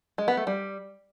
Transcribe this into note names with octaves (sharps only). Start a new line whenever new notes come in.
G#3
B3
A3
G3